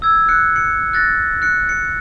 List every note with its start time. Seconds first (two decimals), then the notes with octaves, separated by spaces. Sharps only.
0.02 E6 G#6
0.28 F#6 C#7
0.56 C#7
0.93 F#6 A6 A#6
1.42 F#6 C#7
1.69 C#7